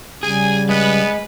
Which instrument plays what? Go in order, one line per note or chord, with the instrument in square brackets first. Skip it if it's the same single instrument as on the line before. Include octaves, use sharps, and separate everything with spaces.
[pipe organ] C#3 G3 [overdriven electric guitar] G#4 [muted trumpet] G#5
[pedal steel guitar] G#3 [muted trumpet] B3 [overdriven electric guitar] B4